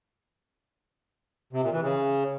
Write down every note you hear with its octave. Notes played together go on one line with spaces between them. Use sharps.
C3
A#2
E3
C#3